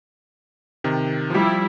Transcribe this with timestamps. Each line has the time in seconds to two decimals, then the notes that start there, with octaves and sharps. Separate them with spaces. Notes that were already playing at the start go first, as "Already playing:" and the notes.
0.84 C3 D#3
1.30 F3 G3 E4 G4